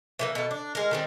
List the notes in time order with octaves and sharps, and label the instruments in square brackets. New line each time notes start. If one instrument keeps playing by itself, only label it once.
[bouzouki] E3 G3 A#3
B2 A4
D4
G#3 A#4
D#3 G3 C4